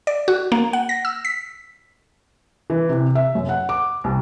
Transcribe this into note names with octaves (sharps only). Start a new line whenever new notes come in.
D5
F#4
A#3
F#5
A#6
E6
B6
E3
C3
E5
F#2
F#5
D6
C2